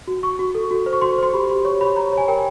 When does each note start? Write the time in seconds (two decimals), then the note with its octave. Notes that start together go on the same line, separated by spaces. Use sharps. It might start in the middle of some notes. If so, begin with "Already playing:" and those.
0.08 F#4
0.23 F#4 C#6
0.39 F#4
0.55 A4
0.71 F#4
0.86 C5
0.93 C#6
1.02 F#4 C6
1.18 C5 C6
1.34 G4 B5
1.49 G4
1.65 C#5 C#6
1.81 C#5 B5
1.96 C#5 A#5
2.13 C#5 G#5
2.28 A#4 G5